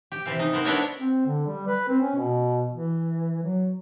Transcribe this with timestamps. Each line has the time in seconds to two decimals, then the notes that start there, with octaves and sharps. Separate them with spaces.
0.12 G4
0.26 C3 E3 F5
0.39 D#4
0.53 B3 A#4 C5
0.65 B3 D4 E4 F#4 A#4 C#5
1.00 C4
1.26 D3
1.47 G3
1.67 B4
1.89 C4
2.01 C#4
2.15 B2
2.71 E3
3.43 F#3